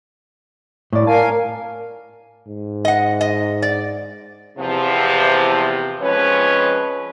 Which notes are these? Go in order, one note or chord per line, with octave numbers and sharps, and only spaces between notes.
A2 D5
A#4 F5 G#5 A5
G#2
D#5 F#5
D#5
D5
E2 C3 F3
F2 F3 G#3 C#4 B4 C#5